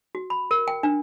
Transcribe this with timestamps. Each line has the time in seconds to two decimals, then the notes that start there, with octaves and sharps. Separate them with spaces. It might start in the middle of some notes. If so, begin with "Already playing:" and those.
0.15 F#4
0.30 B5
0.51 A#4
0.68 G5
0.83 D4